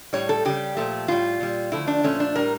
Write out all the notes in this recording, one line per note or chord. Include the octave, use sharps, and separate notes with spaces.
A2 G3 C#5
A4
C#3 G3 G4
A#2 F3 A3
A2 G3 F4
A#2 G3
D3 F3 A3 E4
D4
A#2 F3 A3 C#4
D4
A2 G3 A#4